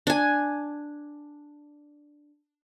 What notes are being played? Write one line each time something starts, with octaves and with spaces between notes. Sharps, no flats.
D4 G#5